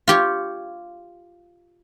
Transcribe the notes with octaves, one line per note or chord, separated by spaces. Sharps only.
F4 G4 C#5